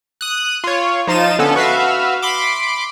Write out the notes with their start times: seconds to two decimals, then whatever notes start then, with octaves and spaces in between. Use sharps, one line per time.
0.21 D#6 F#6
0.64 F4 C#5
1.07 F3 D#4 F4 A6 D#7 E7
1.39 D3 B3 C#4 A4
1.56 F#4 B4 E5 F5
2.22 B5 C6 D6